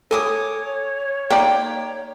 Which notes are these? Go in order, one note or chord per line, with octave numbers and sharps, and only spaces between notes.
A4 C#5 G#5 D6 D#6
A#3 D#4 D5 G5